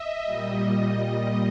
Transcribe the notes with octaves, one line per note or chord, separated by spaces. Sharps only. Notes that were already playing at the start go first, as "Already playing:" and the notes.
Already playing: D#5 E5
A#2 G3